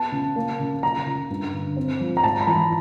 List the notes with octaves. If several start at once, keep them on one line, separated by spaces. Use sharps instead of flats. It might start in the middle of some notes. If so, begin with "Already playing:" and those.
Already playing: B3 A5
C#3
A#3
C#3
A#3 A#5
C#3
G2
D3
C4
F3
A#5
G#2 A5
B5
E3 A#5